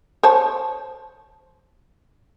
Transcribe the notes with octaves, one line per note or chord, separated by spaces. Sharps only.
C5 C#5 A5